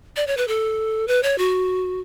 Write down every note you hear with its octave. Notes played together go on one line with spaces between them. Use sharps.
D5
C#5
B4
A4
B4
C#5
F#4